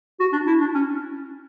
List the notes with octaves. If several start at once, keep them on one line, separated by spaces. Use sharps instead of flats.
F#4
D4
E4
D4
C#4